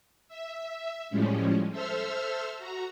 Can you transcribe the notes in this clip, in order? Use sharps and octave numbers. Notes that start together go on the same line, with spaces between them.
E5
A2 F3 G3 G#3 C#4
A4 C5 E5 E6 F6
F#4 A#5